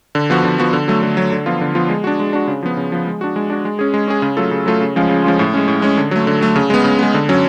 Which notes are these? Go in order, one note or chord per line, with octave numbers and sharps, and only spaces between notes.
D3
F3 B3 F#4
D3
F3 B3 F#4
D3
F#3 A3
D3
F#3 A3
D3
F3 B3 F4
D3
F3 B3 F4
G#3
D4 F#4
G#3
D4 F#4
C#3
F3 B3
C#3
F3 B3
G#3
D4 F#4
G#3
D4 F#4
G#3
C#4 G#4
G#3
C#4 G#4
C#3
F#3 A3 F4 A4
C#3
F#3 A3 F4 A4
C#3
F3 G#3 C#4 F4
C#3
F3 G#3 C#4 F4
A2
G#3 C#4
A2
G#3 C#4
D3
F#3 A3
D3
F#3 A3
C#3
G#3 B3
C#3
G#3 B3
D3
F#3 C#4